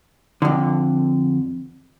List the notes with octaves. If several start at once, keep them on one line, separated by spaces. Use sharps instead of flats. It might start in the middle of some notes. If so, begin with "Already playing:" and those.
F2 D3